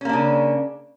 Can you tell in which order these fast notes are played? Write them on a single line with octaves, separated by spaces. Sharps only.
C#4 A#3 D4 C#3